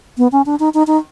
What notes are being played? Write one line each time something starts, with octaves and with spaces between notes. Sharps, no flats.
B3
C#4
D4
D#4
D#4
D#4